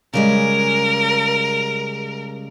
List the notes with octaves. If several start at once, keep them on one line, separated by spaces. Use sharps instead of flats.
C#3 G3 G#3 A#4